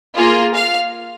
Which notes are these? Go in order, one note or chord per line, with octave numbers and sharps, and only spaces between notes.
A#3 F4 G#4
F5